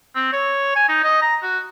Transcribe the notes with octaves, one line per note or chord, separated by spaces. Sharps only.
C4
C#5
G#5
D#4
D#5
A#5
F#4